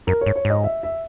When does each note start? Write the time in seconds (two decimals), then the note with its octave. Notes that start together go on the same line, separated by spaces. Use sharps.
0.07 F#2 A#4
0.21 C#5
0.26 G#2
0.36 C#5
0.45 G#2
0.50 D#5
0.64 E5
0.83 E5